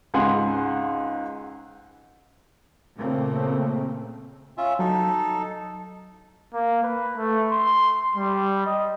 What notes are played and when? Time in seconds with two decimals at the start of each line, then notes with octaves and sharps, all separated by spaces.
0.14 C#2 G#2 F#5 G#5 C6
2.98 A#2 C#3 A3 A#3 C4
4.58 C#4 F4 E5
4.79 F#3 D#4 A4
6.53 A#3
6.83 B4
7.17 A3
7.52 C6
8.16 G3
8.66 D#5